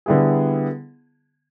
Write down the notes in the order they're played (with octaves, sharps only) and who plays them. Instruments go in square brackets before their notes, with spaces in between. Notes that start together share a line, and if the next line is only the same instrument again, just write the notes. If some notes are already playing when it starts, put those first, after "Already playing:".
[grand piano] D3 G3 B3 E4 G#4